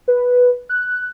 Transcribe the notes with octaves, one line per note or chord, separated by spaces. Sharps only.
B4
F#6